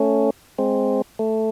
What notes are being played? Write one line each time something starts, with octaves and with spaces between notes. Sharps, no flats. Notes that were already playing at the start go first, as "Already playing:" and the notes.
Already playing: A3 C#4
G#3 C4
A3